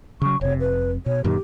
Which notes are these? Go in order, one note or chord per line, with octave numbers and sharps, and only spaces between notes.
C#3 F#3 C#6
F1 C3 C#5
B4
B2 C#5
F#2 A#2 D#3 G4